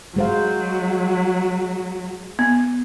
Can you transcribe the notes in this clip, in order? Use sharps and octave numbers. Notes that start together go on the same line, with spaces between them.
F#3 G#3 C5 F5
B3